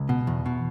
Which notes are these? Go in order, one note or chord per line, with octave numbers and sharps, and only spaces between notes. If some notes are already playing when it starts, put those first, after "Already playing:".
Already playing: C#2
B2
E2
B2